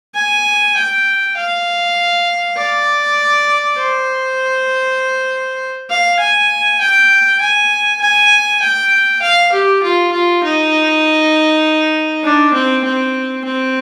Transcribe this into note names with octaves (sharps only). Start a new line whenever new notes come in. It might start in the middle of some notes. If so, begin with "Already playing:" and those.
G#5
G5
F5
D5
C5
F5
G#5
G5
G#5
G#5
G5
F5
G4
F4
F4
D#4
D4
C4
C4
C4